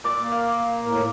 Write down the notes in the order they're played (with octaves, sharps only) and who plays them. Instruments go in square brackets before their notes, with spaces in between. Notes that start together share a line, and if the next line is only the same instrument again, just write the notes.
[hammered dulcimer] A#2 D5 D6
[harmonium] A#3
[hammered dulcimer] F5
[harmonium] A2 A#4